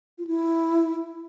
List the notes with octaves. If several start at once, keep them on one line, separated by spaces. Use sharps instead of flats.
F4
E4